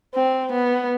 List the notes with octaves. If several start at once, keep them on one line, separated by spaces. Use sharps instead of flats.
C4
B3